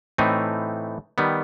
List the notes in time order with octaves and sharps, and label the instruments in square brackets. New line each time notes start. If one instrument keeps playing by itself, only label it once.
[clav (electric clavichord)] A2 E3 A3 C4 D#4
D#3 G3 B3